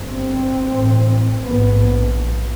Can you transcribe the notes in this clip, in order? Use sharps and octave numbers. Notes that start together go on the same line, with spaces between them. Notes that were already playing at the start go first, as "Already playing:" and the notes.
Already playing: G1 G2 C4
A1 A2
A#1 G#2 B3